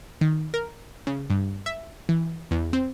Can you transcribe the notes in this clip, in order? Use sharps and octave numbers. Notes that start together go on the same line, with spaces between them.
D#3
A#4
C#3
G2
E5
E3
E2
C4